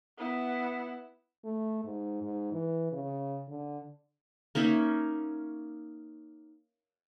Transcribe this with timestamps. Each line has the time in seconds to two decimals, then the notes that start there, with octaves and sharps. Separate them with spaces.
0.17 B3 E4
1.44 A3
1.85 G#2
2.23 G#2
2.52 E3
2.92 C#3
3.48 D3
4.55 A#3 C#4 D#4 E5